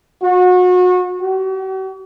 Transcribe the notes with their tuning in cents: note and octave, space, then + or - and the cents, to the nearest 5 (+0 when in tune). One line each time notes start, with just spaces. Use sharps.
F#4 -30
F#4 +45